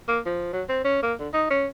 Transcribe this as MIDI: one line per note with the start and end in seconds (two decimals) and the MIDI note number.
0.08 0.20 58
0.26 0.50 53
0.53 0.63 54
0.69 0.81 60
0.85 1.00 61
1.03 1.14 58
1.20 1.28 50
1.33 1.46 63
1.50 1.67 61